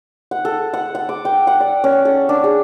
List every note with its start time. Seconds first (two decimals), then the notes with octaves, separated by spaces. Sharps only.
0.31 F#5
0.45 A4
0.74 F#5
0.95 F#5
1.09 D6
1.25 G5
1.47 F#5
1.60 D5
1.84 C#4
2.05 A4
2.29 D4
2.44 G#4